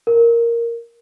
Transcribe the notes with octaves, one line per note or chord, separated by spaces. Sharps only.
A#4